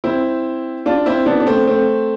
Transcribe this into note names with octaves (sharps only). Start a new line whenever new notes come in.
C4 E4
D4 F4
C4 E4
B3 D4
D4
A3 C4
A3 C4